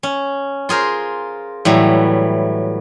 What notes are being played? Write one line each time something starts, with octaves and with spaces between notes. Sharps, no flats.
C#4
F4 G#4 A#4 C5
A2 E3 F#3 G3